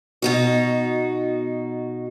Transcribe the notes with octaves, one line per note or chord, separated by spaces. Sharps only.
B2 D#4 F#4